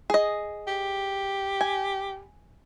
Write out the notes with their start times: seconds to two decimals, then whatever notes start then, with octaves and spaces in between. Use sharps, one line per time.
0.10 G#4 D#5
0.67 G4
1.61 G#5